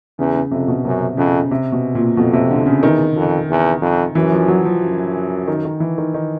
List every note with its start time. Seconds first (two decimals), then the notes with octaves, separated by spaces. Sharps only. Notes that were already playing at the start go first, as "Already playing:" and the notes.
0.18 E2 C#3
0.35 C#3
0.51 F2 C3
0.68 B2
0.85 F#2 C3
1.17 F2 C#3
1.51 C3
1.72 B2
1.95 A#2
2.17 F2 B2
2.33 C3
2.50 D3
2.66 C#3
2.83 E2 D#3
3.16 F2
3.50 E2
3.82 F2
4.15 F#2 E3
4.32 F3
4.48 F#3
4.65 F3
4.82 F#2
5.48 D#3
5.65 D#3
5.80 E3
5.98 D#3
6.14 D#3